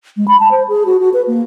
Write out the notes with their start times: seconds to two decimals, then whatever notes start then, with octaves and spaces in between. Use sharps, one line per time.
0.17 G#3
0.28 B5
0.40 A5
0.51 C5
0.68 G#4
0.86 F#4
1.00 F#4
1.14 B4
1.27 A#3